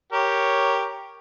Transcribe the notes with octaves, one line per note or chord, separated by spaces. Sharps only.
G4 A#4 C#5